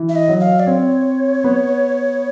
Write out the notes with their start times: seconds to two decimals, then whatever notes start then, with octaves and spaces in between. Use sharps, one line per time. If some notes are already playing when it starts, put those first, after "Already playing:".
Already playing: E3
0.09 E5
0.15 D#5
0.28 F#3
0.40 F5
0.60 D5
0.66 C4 C#5
1.44 B3